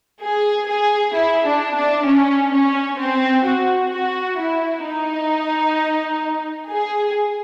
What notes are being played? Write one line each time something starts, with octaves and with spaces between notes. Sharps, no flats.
G#4
G#4
E4
D4
D4
C#4
C#4
C4
F#4
F#4
E4
D#4
G#4